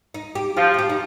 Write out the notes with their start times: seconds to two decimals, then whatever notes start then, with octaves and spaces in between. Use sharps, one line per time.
0.14 D#4
0.35 G4
0.57 F3 G4
0.74 F4
0.78 G4
0.90 D#4